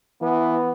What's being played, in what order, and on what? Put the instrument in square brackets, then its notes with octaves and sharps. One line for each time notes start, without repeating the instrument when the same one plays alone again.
[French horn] E3 [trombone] B3